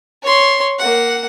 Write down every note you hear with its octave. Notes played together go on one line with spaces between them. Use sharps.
C#5 C6
A#3 F#5